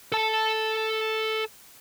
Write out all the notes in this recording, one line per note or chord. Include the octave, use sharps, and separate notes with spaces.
A4 A5